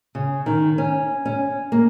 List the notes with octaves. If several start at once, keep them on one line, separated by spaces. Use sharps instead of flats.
C#3
D#3
C#4
C#4
A#3